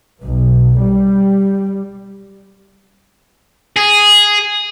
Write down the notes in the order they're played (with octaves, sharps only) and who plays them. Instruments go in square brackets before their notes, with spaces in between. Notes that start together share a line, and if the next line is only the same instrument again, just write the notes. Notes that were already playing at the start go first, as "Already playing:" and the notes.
[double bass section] B1
G3
[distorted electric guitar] G#4